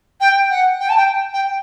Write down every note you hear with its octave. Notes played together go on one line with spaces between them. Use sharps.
G5
F#5
G5
A5
G5
G5